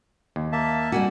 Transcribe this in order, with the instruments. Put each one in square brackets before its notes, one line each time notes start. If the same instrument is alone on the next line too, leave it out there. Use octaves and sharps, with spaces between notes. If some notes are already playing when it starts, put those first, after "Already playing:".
[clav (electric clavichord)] D#2
[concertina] A#3 E5 A5
[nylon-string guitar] G3 C4 F#4 [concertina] G#5